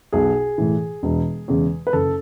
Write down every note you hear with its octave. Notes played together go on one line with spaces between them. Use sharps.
B1 G#4
A2 E3
E1
E2 C#3 G#3
B4
F#1 A4